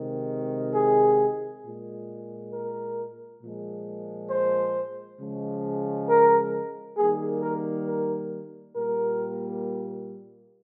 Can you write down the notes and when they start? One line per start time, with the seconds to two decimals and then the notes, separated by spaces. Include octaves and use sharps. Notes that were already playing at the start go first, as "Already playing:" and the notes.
Already playing: C3 D#3 G#3
0.75 G#4
1.65 A#2 G#3
2.54 A#4
3.42 A#2 F3 G#3
4.30 C5
5.19 C#3 F3 G#3
6.08 A#4
6.97 D#3 G3 A#3 G#4
7.43 A#4
7.87 A#4
8.75 A#2 G3 A#3 A#4